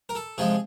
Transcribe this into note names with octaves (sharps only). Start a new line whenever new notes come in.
A#4
A4
C3 F3 G#3 G#4